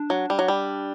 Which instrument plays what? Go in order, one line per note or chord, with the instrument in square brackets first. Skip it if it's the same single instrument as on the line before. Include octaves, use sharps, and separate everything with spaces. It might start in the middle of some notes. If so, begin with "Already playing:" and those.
Already playing: [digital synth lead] D4
[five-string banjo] F#3
G3
F#3
G3